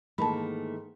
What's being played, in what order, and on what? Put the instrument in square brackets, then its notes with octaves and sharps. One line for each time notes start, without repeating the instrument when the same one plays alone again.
[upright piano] G#2 D#3 E3 [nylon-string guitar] A3 A#3 [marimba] A5 B5